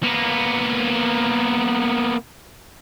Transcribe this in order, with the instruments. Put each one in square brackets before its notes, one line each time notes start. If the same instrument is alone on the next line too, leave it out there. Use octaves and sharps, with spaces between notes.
[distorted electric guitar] A#3 B3